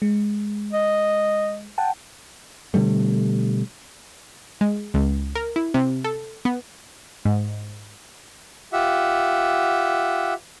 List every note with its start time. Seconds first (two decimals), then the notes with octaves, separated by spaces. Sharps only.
0.02 G#3
0.73 D#5
1.78 F#5 G5 A5
2.74 B2 D3 G3 A3
4.61 G#3
4.94 C#2
5.35 A#4
5.56 E4
5.74 C3
6.04 A4
6.45 B3
7.25 G#2
8.73 F4 G4 E5 F#5